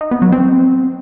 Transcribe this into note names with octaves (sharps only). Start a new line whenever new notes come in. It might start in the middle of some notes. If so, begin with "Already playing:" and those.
D#4
B3
F#3
C4